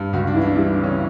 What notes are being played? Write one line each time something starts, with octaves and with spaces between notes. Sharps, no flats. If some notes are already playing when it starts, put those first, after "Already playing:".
Already playing: G2
C#2 F#4
D4
E3 E4
D4
G3 E4
D4
C#3
C#4